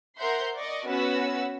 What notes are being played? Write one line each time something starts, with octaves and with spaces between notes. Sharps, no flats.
A#4 C5 E5 F#5 C6 G6
D5 D#5 C#6
B3 C#4 F#4 B4 F#5 E6